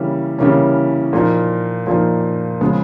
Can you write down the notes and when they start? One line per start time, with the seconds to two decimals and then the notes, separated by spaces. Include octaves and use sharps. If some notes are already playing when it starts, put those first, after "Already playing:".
Already playing: C#3 E3 G3 A#3 C#4
0.38 C#3 E3 G3 A#3 C#4
1.13 A#2 F3 A#3 D#4
1.87 A#2 F3 A#3 D#4
2.61 C#3 F3 G#3 B3